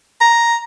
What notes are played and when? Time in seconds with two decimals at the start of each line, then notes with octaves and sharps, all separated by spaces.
0.21 A#5